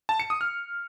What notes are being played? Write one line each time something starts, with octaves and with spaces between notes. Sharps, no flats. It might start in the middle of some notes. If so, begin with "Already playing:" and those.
A5
C#7
D#6
F6